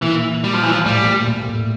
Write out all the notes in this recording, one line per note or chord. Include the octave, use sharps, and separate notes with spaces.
A#2 E3 A#3
G3
F3
E3
F3
A2 G3 A3
A#2 A#3
A#2 A#3
A2 A3